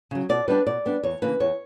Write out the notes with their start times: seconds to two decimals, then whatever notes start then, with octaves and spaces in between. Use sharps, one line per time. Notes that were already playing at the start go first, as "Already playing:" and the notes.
0.11 C#3 F#3
0.29 B2 D5
0.48 G3 B3 D4 B4
0.67 B2 D5
0.85 G3 B3 D4
1.03 E2 C#5
1.22 C#3 E3 A#3 D4 B4
1.40 E2 C#5